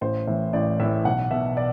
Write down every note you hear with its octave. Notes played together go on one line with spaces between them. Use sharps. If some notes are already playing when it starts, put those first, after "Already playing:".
A1 C5
A2 E3
A1 D5
A2 E3 E5
B1 F#5
B2 E5
D5